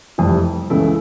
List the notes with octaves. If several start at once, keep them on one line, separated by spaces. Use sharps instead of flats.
F1 F2 E3 G3
C#2 C#3 E3 A3 E4